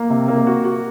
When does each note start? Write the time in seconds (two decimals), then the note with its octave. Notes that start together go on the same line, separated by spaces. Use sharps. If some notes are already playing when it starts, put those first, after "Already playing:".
Already playing: A#3
0.10 C3
0.28 A#3
0.47 F#4
0.64 F#4